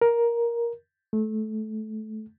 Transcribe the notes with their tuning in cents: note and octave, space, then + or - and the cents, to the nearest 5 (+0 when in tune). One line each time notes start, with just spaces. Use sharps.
A#4 +10
A3 -20